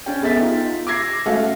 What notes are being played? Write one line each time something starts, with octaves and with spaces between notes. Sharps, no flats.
C#4 D4 D5 G5
E2 B3 A4 E5 A6 B6
D#4 F4
D6 E6 G#6 A#6 C7
A3 C#4 F#4 A4 E5 F5